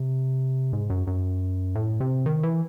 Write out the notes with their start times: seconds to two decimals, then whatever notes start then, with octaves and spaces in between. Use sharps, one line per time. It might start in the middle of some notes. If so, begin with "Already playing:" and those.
Already playing: C3
0.73 G#2
0.90 F#2
1.07 F#2
1.75 A2
2.00 C3
2.26 D#3
2.43 E3